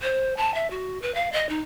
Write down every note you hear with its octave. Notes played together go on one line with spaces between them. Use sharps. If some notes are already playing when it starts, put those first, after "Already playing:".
C5
A5
E5
F#4
B4
F5
D#5
D#4